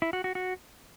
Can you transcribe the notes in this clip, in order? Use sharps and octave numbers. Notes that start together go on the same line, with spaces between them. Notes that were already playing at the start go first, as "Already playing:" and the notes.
E4
F#4
F#4
F#4